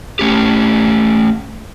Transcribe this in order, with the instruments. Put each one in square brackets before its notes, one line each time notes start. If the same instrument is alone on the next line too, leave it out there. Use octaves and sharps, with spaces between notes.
[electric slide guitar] A3 C#4 G4